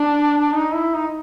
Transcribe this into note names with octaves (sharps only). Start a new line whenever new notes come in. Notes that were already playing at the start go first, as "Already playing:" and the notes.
Already playing: D4
D#4
E4
D#4